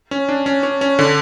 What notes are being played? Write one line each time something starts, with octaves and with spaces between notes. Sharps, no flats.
C#4
D4
C#4
C#4
C#4
D3